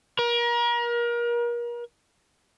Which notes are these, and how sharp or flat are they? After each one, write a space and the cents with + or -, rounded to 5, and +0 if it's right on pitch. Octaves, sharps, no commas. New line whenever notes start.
A#4 +35